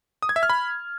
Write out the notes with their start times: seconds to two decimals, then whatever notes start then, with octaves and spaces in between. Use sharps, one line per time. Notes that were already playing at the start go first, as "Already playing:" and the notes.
0.22 D#6
0.29 G#6
0.36 E5
0.43 F6
0.49 B5